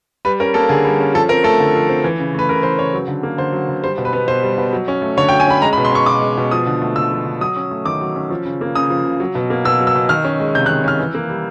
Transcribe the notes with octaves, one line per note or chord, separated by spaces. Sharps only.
G3 B4
C#4 A#4
A#3 A4
D3 G#4
G3
C#4
F3 A4
C4 A#4
A3 A4
D3
F3
C4
E3
C#3
A3 B4
C#3 A#4
E3 C5
C#3 C#5
F#3
D3
A#3
D3 C5
F#3
D3
G3 C5
B2
B4
B3
B2 C5
G3
B2
F#3
C#4
A3
D3 C#5
G5
F#3
G#5
C#4 B5
G#3 A#5
B5
B2
C6
C#4 C#6
B2 D6
G#3
B2
F3 D#6
D3
A3
D3 E6
F3
D3
F#3 D#6
C#4
A3
D#3 D6
F#3
C#4
F3
C#3
A#3
C#3 D#6
F3
C#3
F#3
B2
A#3
B2 E6
F#3
E6
B2
D#3 F6
C#4
G#3
C3 G6
F#6
D#3
C#4 F6
E3
A#3
G3